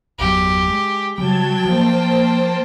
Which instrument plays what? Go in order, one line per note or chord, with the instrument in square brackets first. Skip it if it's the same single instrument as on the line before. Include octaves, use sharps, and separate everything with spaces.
[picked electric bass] G1 E2 F#3 [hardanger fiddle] G4
[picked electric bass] G#3
[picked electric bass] C#3 G3 [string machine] F#3 A5 G#6 [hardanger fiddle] G5
[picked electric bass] F3 [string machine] A#3 C5 A5